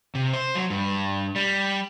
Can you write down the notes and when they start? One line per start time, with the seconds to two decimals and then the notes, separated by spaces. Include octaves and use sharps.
0.15 C3
0.33 C5
0.55 F#3
0.70 G2
1.36 G3